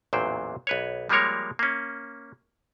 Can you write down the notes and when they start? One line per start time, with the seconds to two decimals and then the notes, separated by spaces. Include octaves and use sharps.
0.13 A1 E2 A#2 F#3 C5 G5
0.67 B1 B4 C#5
1.09 F3 G3 G#3 A#3 A#4 C#5
1.59 A#3 C#4